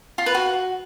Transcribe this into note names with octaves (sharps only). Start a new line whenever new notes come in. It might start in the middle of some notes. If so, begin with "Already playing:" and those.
F4
B4
F#4